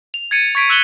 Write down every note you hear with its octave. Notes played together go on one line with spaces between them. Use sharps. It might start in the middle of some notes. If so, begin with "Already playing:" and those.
F7
G#6 A6 C#7 D#7
C#6 G#6 B6 D7
E6 F#6 E7 F#7 G7